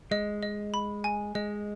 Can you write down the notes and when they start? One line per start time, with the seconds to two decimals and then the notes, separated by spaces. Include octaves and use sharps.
0.11 G#3 D#5
0.42 D#5
0.74 B5
1.04 G#5
1.35 G#3 D#5